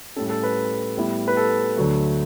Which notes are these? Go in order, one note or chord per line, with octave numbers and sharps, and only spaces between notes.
A2 G3 C#4 A4
A4
B4
A2 G3 B3 E4
B4
A4
D2 D3 F#3 A3